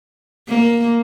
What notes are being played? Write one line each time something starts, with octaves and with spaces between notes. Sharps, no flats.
A#3